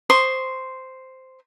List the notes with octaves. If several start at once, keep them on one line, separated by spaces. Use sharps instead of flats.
C5 C6 C#6 D#6